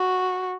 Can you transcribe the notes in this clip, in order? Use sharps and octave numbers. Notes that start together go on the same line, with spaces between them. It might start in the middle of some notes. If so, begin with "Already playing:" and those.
Already playing: F#4